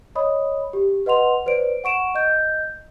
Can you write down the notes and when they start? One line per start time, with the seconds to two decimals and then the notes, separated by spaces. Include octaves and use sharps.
0.15 C#5 D#5 B5 D#6
0.73 G4
1.06 B4 D#5 F#5 C6 F7
1.46 B4 C5 D5 D7
1.84 F#5 C#6 D7 E7
2.15 D#5 G6